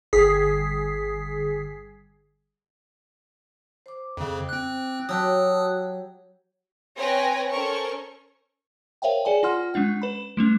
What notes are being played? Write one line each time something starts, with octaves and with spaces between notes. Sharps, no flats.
G1 G#4 B6 C7
C5 D6
F2 C#3
C4 F#6
F#3 F#4 G4 A5 D#6 E6 F#6
C4 B4 C#5 G5 G#5 A#6
C#4 A4 A#4 C5 C#6
A#4 C5 C#5 E5 F5 G5
G#4 B4 D5 G#5
F4 F#5 C6 F6
G#3 C#4 D4 F#5
B4 B5
G3 A3 C#4